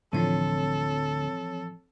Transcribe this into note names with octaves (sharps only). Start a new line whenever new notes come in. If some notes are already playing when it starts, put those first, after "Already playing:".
D2 A2 E3 F3 C4 A4 C#5